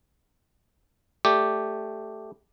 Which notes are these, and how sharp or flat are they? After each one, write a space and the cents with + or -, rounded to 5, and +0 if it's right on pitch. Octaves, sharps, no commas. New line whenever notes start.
A3 +0 G4 +0 D5 +0